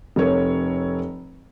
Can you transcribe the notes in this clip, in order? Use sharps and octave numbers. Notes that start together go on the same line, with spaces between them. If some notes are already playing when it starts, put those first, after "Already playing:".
F1 A4 A#4 C#5